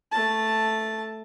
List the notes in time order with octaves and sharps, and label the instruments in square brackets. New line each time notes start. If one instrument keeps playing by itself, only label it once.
[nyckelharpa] A3 A5